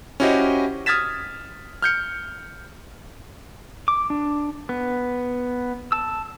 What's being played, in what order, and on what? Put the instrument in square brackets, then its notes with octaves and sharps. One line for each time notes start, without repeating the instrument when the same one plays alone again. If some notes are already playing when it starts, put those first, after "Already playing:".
[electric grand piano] C#4 E4 F#4 G4 C5 D#5
D#6 F6 G#6 A6 B6 E7
F6 G6 C#7
[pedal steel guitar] D6
D4
B3
A5 E6